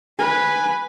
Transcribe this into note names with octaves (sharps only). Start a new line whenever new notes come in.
B4 G#5